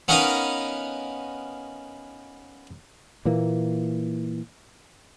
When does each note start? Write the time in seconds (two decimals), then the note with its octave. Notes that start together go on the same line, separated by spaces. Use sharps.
0.08 B3 C#4 D#4 A#4 D#5 F5
3.25 A#2 E3 A#3